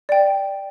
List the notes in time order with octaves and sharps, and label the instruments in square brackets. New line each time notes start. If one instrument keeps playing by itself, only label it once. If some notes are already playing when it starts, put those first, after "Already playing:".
[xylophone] D5 G5